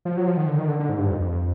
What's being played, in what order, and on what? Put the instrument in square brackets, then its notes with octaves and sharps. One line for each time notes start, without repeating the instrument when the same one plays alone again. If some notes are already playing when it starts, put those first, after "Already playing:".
[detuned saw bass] F3
F#3
F3
D#3
D3
D#3
D3
D3
G#2
G2
F2
F2